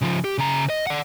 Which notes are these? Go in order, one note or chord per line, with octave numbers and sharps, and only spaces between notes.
C#3 F3
G4
C#3 A#5
D#5
D5 F#5